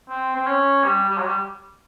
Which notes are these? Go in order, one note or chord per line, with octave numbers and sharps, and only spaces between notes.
C4
C4
C#4
G3
G3
F#3
G3